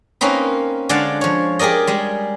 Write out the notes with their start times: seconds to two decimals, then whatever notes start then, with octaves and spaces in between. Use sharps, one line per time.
0.21 A#3 C4 C#4 D#4 B4
0.89 D3 G#3 D5 F5 F#5 A5
1.21 F3 C#5
1.59 G4 G#4 A#4 D5 D#5
1.87 G3 G#3